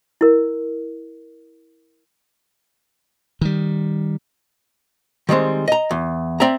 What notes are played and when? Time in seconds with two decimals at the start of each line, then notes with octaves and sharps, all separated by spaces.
0.21 E4 A#4
3.41 D#3 G3
5.29 D#3 G3 G#3 C4
5.68 D#5 A#5
5.91 E2
6.40 C4 D5 E5 A#5